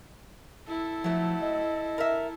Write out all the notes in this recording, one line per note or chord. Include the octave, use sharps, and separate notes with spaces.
E4 A4
F3 F#3 A3
D#5
A#4 E5